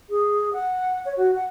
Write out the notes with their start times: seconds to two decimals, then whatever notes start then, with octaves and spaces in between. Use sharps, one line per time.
0.10 G#4
0.53 F#5
1.05 C#5
1.17 F#4
1.36 F#5